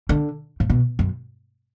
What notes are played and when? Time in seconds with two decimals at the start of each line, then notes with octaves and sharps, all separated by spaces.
0.09 D3
0.60 A2
0.70 B2
0.99 F#2